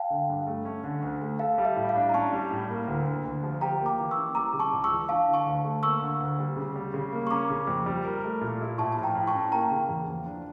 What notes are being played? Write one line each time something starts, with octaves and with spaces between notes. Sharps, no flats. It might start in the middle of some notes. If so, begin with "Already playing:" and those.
Already playing: F5 G5 A5
D3
G2
A3
C#4
D3
D2
A3
A4 F5
G3
E5
A2
F5
D4
A#5
C#4 A5 C#6
G3
A2
A#3
D2
D3
D2
F3
G4 G5 A#5
A#3
A#5 D6
E3
C#6 E6
C#4
G3 A#5 D6
C#3
A5 C#6
C#2
C#6 E6
E3
D4 F5 A5
D3
A5 C#6
D2
A3
A#3 C#6 E6
D3
D2
G3
C#3
G3
C#3
A#3
C#6
C#4 A#5 D6
C#3
F2
G3
A#4
A3
A#2
E4
A2 A5 C#6
F3 A5
G5 A#5
A2
A5 C#6
C#4
A#3 G5 A#5
C#3
E2
F3
D4